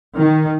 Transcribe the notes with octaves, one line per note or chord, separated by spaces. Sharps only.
D#3